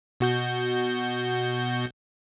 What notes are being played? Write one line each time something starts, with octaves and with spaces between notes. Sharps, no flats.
B2 F#4 G6